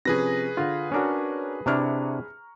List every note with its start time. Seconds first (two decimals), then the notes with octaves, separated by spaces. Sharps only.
0.05 C3 F3 C#4 G#4 B4 A#6
0.57 D3 F4 F5
0.92 C#4 D4 F#4 A#4 C#5
1.66 C3 D4 E4 A#5 C#6 F6